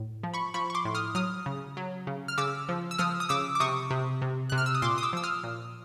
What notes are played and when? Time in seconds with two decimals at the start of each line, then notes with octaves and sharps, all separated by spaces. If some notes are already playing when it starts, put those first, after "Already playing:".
Already playing: A2
0.23 F3
0.34 B5 C#6
0.54 F3 B5 C#6
0.70 C#6
0.75 C6 D6
0.85 A2
0.95 D#6 F6
1.15 F#3 D#6 F6
1.46 C#3
1.77 F#3
2.07 C#3
2.28 F6
2.38 C#3 D6 E6
2.69 F3
2.91 E6
2.99 F3 D#6 F6
3.20 D#6
3.29 C#3 D6 E6
3.55 D6
3.60 C3 C#6 D#6
3.90 C3
4.22 C3
4.50 C3 F#6
4.58 F6
4.66 E6
4.75 D#6
4.82 A#2 C6 D6
4.98 D#6
5.03 D6 E6
5.13 F3 E6
5.24 D#6 F6
5.43 A#2